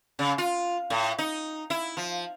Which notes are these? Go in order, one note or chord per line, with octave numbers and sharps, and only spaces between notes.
C#3
F4
A2
D#4
E4
F3